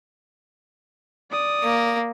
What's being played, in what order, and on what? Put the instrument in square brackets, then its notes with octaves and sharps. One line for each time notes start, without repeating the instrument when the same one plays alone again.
[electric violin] D5 D#6
[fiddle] A#3